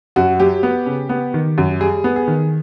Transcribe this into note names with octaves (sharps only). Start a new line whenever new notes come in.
F#2 F#4
F#3 G4
B3
C#3
B3
D#3
F#2
G3 G#4
B3
G#4
D#3